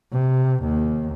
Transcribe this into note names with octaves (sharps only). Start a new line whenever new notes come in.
C3
D#2